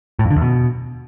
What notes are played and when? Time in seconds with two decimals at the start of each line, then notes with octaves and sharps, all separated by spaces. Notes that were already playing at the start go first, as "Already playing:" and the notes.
0.19 A2
0.25 F2
0.31 D3
0.36 E2
0.42 B2